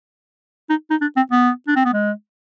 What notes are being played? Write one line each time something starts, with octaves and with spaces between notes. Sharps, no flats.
D#4
D#4
D4
C4
B3
D4
C4
B3
G#3